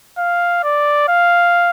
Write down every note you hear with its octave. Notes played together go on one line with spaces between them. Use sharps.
F5
D5
F5